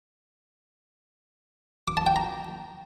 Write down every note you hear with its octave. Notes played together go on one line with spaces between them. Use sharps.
D6
A5
G5
A#5